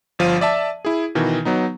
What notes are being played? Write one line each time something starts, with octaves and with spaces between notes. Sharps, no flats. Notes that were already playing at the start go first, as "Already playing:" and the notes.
G1 F3 F5 D#7
D5 E5 A5
E4 G#4
B2 D#3 E3
F#3 B3 D#4